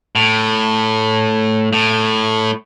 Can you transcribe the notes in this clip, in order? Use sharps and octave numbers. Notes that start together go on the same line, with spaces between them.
A2
A2